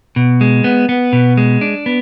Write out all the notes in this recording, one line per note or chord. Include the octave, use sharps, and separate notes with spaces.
B2
G#3
B3
B3
B2
G#3
D4
B3